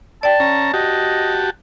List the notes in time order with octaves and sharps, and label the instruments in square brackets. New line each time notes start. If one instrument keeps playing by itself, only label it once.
[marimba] D5 G5 [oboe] A5
[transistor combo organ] C#4 A#5
[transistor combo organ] F#4 G4 A5 [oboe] D#5